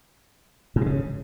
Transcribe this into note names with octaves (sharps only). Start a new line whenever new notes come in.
G#2
B2
C#3